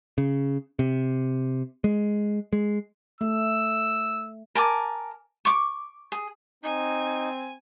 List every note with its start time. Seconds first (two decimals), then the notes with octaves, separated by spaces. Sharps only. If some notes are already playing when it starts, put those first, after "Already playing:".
0.18 C#3
0.79 C3
1.84 G#3
2.53 G#3
3.21 A3 E6
4.55 A#4 G#5 A5 D6
5.45 C#6 D6
6.12 G#4
6.64 C4 D#4 G#5